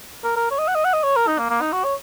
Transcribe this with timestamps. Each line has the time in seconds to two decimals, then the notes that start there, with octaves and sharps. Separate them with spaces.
0.24 A#4
0.36 A#4
0.51 C#5
0.59 D#5
0.68 F#5
0.75 D#5
0.85 F#5
0.93 D#5
1.03 C#5
1.16 A#4
1.27 D#4
1.38 A#3
1.50 A#3
1.61 D#4
1.72 F#4
1.84 C#5